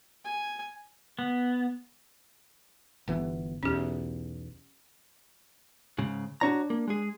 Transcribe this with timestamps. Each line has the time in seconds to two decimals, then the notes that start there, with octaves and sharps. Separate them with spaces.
0.25 G#5
1.19 B3
3.08 G1 E3 B3
3.63 B1 E2 C#4 G4
5.98 G#2 C#3
6.41 D4 F#4 C#5 A#5
6.70 A#3
6.88 G#3 G#4